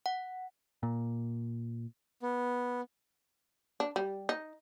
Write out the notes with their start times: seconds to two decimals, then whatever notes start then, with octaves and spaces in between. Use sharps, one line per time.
0.06 F#5
0.83 A#2
2.22 B3
3.80 D4
3.96 G3
4.29 D#4